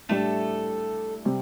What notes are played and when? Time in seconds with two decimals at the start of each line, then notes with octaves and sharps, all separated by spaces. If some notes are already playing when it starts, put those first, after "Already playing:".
0.09 A2 G3 A3 D4 A4
1.25 C3 G3 C4